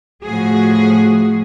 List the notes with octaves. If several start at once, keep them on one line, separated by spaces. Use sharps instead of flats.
A2 F3 F#4 G#4